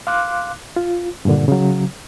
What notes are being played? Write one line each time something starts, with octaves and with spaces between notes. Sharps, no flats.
F5 C6 D6 F#6
F4
G2 A#2 D3
C#3 F#3